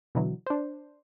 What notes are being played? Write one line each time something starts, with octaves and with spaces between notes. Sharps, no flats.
B2 D3 E3 F#3
D4 C5